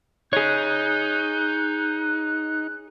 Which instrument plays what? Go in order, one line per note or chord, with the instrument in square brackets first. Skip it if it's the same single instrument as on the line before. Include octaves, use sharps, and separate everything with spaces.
[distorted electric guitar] D#4 [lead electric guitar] G#4 C#5 [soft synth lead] F#6 [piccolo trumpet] G6